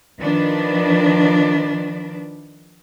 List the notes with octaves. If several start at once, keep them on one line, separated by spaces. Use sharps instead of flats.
D#3 F3 D4 B4